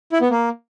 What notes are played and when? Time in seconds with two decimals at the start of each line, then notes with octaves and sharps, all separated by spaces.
0.12 E4
0.21 B3
0.30 A#3